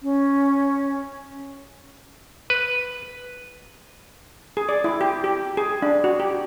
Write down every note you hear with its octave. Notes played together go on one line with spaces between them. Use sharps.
C#4
B4
G#4
D5
E4
G4
G4
G#4
D4
F#4
G4